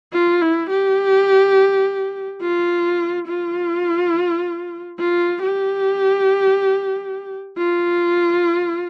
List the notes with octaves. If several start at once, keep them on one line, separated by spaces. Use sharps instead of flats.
F4
E4
G4
F4
F4
F4
G4
F4